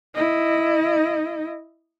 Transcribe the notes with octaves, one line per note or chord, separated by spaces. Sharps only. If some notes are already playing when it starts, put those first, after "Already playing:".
E4 D#5